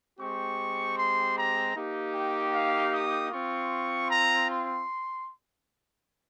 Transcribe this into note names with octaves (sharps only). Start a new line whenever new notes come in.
G#3 C4 G4 C#6
C6
A#5
A#3 D#4 G4
G5
F5
D#6
C4 F4 C#6
A#5
C6